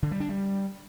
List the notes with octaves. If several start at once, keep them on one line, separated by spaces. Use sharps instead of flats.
D3
G3
D4
G3